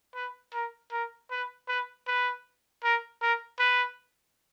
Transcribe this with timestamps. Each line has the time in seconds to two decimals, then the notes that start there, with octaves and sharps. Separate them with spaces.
0.15 B4
0.53 A#4
0.92 A#4
1.31 B4
1.68 B4
2.08 B4
2.84 A#4
3.22 A#4
3.59 B4